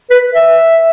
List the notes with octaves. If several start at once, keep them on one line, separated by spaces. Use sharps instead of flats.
B4
E5